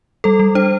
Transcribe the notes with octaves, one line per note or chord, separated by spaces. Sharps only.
G3 A4
G3
D4 C5